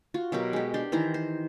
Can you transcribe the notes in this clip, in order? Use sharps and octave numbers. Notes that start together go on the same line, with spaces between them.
F4 F#4
B2 F#3 G4 A#4
G#3 G4
D4 G4 C6
D#3 E3 C5 A#5
C5